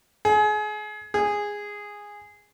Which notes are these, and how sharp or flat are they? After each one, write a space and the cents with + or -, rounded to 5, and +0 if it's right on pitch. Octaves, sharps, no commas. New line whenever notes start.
G#4 +30
G#4 -10